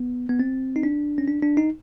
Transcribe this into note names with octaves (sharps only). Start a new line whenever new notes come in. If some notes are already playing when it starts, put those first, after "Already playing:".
Already playing: B3
B3
C4
D#4
D4
C#4
D4
D4
D#4